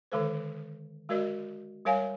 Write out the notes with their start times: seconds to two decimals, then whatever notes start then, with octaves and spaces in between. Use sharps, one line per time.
0.12 D3 D#3 G#3 A4 C5
1.09 G#3 F#4 A#4 D5 D#5
1.85 G3 A#4 C#5 F5 G#5